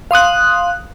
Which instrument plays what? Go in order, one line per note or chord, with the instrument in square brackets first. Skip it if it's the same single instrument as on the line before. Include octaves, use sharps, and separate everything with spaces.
[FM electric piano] F5 C6 D#6 F#6